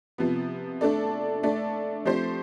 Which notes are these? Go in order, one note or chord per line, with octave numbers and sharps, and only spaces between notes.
C3 F3 B3
A3 D4 A4 D5
A3 D4 A4 D5
F3 A3 C4 G4 C5